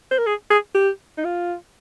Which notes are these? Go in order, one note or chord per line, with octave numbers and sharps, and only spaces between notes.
C5
A#4
G#4
G#4
G4
D#4
F4